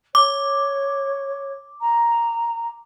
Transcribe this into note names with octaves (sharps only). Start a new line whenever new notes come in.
C#5 D6
A#5